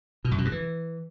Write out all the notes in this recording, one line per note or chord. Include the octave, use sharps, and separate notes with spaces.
B2
F#2
B2
G2
E3